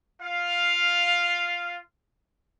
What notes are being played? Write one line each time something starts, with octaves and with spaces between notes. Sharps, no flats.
F4 F5